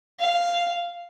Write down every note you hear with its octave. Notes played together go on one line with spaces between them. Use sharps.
F5